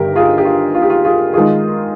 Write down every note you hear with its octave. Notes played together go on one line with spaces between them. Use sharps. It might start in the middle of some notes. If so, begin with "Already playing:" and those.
Already playing: G1 G2 D#3 G4 A#4
F4 G#4
G4
F4
F4
G4
F4
F4 G#4
D#3 G#3 F4 G#4